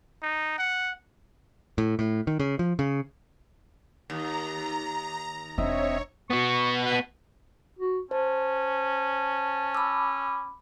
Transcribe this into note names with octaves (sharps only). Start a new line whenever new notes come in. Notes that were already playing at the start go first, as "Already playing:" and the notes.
D#4
F#5
A2
A2
D#3
C#3
F3
C#3
D#2 A#5
E1 C4 D4 C#5 D#5 E5
B3 F#4 C#6
B4
F#4
C#4 C5 A5
B5 D6 E6